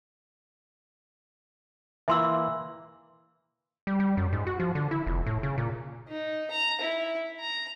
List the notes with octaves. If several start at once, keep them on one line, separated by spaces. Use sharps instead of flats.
E3 A#3 E5 C6 E6
G3
G3
F#2
G#2
F#4
F3
D3
E4
F1
A2
C#3
A#2
D#4
A#5
E4
A#5